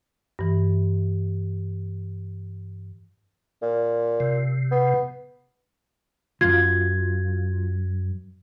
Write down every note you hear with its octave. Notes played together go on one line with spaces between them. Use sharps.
G2 E3
A#2
C3
B3
C#2 F#2 F4 G#6